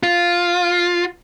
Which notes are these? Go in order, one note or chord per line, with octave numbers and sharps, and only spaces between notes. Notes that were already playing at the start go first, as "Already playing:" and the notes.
F4